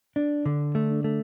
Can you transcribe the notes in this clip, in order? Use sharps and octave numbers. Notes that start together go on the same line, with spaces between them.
D4
D3
A3
A3